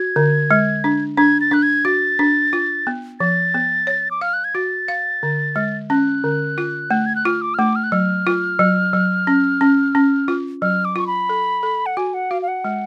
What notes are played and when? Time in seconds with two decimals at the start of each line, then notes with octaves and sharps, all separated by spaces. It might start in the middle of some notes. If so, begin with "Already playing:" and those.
Already playing: F#4 G#6
0.16 D3
0.51 G#3
0.84 D4
1.17 D4 G#6
1.41 A6
1.51 D4 F#6
1.63 G#6
1.85 F#4 A6
2.19 D4
2.53 F4
2.87 B3
3.20 F3 A6
3.54 B3
3.87 C#5
4.11 D6
4.21 F5 F6
4.33 F#6
4.44 G#6
4.55 F#4 A6
4.88 F5
5.23 D3
5.56 G#3
5.90 C#4 F#6
6.24 D3
6.58 F4
6.91 A3
7.06 G#6
7.16 F#6
7.25 F4 F6
7.42 D6
7.54 F6
7.59 A3 D6
7.76 F6
7.84 F#6
7.92 F#3 F6
8.27 F4
8.59 F#3
8.93 F#3
9.27 C#4
9.61 C#4
9.95 C#4
10.28 F4
10.62 F#3 F6
10.85 D6
10.96 F4 C#6
11.07 B5
11.29 A4
11.63 A4
11.86 F#5
11.97 F#4 G#5
12.14 F#5
12.31 F#4 F5
12.42 F5
12.48 F#5
12.64 G#3